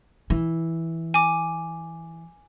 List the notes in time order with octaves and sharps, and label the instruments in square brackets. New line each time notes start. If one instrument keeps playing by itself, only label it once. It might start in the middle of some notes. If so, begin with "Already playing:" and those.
[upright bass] E3
[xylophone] G#5 D6